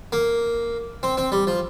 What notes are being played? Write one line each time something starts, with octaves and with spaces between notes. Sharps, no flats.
A#3
C4
C4
G3
F3